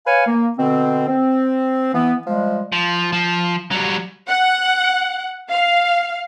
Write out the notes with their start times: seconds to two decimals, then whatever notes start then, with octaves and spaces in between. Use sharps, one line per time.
0.06 B4 C#5 F5 G#5
0.26 A#3
0.58 B2 D3 C4
1.08 C4
1.94 E3 B3
2.27 F3 G3 G#3
2.72 F3
3.13 F3
3.71 F#3 G3
4.29 F#5
5.51 F5